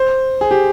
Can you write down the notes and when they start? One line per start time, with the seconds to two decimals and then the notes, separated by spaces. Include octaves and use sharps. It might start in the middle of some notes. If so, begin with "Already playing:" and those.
Already playing: C5
0.41 G#4
0.51 G4